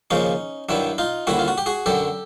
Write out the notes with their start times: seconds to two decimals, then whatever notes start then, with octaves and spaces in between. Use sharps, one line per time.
0.10 D#2 C#3 F3 C#4 D#4
0.69 G2 D#3 F#3 D4 E4
0.98 D#4 F4
1.27 D#2 D3 G3 E4 F#4
1.39 F4
1.48 F#4
1.58 G4
1.66 F#4 G#4
1.86 F#2 D3 F#3 G4 A4